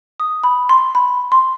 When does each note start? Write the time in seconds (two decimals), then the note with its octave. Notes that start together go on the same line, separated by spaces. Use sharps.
0.20 D#6
0.44 B5
0.69 C6
0.95 B5
1.32 C6